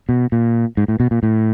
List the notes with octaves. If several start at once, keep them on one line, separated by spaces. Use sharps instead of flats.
B2
A#2
G#2
A2
B2
A#2
A2